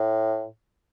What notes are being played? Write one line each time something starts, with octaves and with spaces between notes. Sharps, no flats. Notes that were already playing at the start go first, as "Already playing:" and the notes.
Already playing: A2